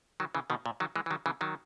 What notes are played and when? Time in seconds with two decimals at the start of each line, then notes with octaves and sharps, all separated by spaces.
0.20 D#3 F#3
0.35 C#3 E3
0.50 B2 D#3
0.66 A#2
0.80 D#3 F#3
0.96 E3 G#3
1.06 E3
1.11 D#3 F#3
1.26 C#3 E3
1.41 D#3 F#3